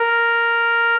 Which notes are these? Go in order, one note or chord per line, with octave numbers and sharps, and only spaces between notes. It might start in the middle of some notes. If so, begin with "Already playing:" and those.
Already playing: A#4